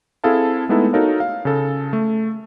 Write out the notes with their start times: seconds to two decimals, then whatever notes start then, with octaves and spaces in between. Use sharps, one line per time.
0.24 C4 E4 G#4 A4 F5 A5
0.69 G#3 A3 B3 D#4 E4 A4
0.93 D#4 F#4 A4 A#4 C#5 F5
1.20 F5
1.45 C#3 A4
1.93 A3